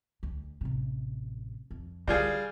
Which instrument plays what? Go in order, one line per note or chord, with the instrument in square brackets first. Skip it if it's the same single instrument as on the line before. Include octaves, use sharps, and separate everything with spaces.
[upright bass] D2
A1 C3
F2
[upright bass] D3 [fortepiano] G3 F4 G#4